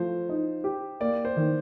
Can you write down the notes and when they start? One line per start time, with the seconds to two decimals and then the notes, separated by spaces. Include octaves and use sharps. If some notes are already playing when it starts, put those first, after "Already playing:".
Already playing: F3 A3 C5
0.29 D#4
0.64 G4
1.00 A#3 D5
1.25 C5
1.37 D#3